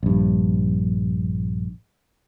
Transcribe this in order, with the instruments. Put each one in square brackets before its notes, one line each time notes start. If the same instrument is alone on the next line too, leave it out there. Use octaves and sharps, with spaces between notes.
[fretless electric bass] A#1 G2